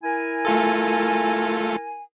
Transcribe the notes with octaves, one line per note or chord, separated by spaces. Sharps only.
E4 A#4 G#5
A3 F4 A4